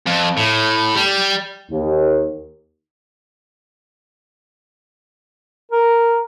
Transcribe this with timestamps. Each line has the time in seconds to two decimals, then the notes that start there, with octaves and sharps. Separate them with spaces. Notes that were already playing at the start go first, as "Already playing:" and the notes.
0.07 F2
0.37 A2
0.96 G3
1.71 D#2
5.72 A#4